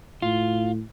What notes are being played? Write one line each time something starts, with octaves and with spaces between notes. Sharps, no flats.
A2 F4